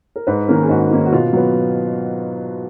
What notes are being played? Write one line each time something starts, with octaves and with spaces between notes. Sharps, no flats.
A#4
G#2 B4
D#3 A#3 C#4 A#4
G#4
G#2 F#4
D#3 A#3 C#4
F#4
B2 F4
F#3 B3